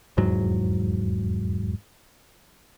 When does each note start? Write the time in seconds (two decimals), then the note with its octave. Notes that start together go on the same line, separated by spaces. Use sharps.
0.17 F1 E2 G#2 F#3